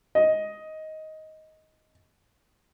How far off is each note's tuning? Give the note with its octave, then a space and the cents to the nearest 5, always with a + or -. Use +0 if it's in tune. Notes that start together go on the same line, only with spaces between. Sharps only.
D#5 +10